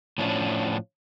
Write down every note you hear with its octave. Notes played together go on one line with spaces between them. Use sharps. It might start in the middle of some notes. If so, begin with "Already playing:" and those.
A2 F3 C#4 D4